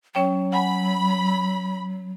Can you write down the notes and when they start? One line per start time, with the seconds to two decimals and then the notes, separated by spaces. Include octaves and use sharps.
0.15 F#3 C#4 C#5 G5
0.52 F#5 G#5 B5